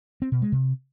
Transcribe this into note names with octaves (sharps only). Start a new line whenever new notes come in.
C4
B2
G#3
C3